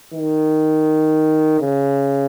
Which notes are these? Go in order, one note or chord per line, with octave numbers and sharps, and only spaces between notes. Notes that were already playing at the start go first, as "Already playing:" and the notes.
D#3
C#3